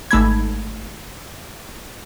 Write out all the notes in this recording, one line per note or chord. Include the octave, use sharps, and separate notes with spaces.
G#1 A3 B5 G#6